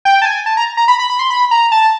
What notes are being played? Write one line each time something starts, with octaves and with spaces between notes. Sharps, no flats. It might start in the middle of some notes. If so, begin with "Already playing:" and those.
G5
A5
G#5
A5
A#5
A#5
B5
B5
B5
C6
B5
A#5
A5